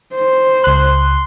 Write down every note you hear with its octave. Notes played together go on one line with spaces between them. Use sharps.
C5
C#2 C6 F#6